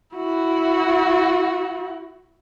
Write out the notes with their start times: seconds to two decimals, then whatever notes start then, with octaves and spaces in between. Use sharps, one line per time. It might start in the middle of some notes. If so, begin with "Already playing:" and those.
0.15 E4 F#4